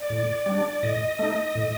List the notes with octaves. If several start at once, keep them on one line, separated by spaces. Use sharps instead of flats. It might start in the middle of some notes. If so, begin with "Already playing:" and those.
Already playing: D5
A2
G3 D4
A2 D#5
A3 D#4
A2